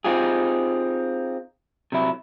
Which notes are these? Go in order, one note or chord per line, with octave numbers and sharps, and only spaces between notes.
C4 D#4 F4 G4 G#4
C3 F#3 E4